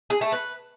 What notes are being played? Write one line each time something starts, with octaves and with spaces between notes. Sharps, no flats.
G#4
A3
B4